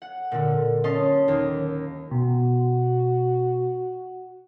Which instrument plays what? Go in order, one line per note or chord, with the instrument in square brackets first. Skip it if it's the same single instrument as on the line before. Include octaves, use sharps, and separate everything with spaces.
[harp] F#5
A#2 D3
C#4 D#5 A5 C6
D#2
[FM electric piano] B2 [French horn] F#4